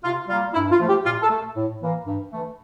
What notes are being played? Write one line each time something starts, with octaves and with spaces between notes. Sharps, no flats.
C3 F4
G3 A#3 F4
G2 E4
F4
F3 A3
G4
A#2 F4
A4
A3
A2
E3 A#3
G2
E3 A3